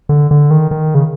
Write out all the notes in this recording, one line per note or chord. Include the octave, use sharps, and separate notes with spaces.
D3
D3
D#3
D#3
C#3